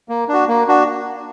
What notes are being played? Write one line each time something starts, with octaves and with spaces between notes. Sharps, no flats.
A#3
D4
F#4
A#3
D4 F#4